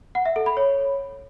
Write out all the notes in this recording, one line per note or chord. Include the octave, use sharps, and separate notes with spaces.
F#5
E5
A4
B5
C#5